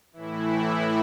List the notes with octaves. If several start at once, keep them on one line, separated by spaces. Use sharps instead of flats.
A2 E3 E4